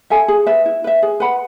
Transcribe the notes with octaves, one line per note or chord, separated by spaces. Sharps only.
A4 E5 G#5
G#4
B4 E5
E4
B4 E5
G#4
B4 F#5 B5